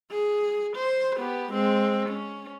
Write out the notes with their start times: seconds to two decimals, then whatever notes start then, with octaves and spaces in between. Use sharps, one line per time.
0.11 G#4
0.76 C5
1.16 B3 G4
1.52 G#3 C4
2.09 C#4